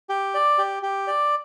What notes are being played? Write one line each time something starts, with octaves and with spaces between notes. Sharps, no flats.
G4
D5
G4
G4
D5